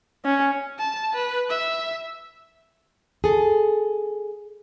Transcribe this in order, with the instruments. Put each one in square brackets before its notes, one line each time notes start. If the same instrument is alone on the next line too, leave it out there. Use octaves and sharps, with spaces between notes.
[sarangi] C#4
[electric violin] A5
B4
E5
[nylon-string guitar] G#4 A4